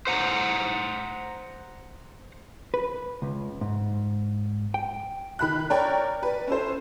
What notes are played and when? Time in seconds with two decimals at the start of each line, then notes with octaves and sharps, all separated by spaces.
0.07 C5 F#5 A#5
2.74 B4
3.22 C#2
3.61 G#2
4.74 G5
5.39 D#3 B5 F#6
5.70 A#4 C#5 D5 G5
6.23 B4 D5
6.47 C#4 A4 C5